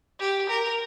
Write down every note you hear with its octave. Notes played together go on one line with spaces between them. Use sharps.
G4
A#4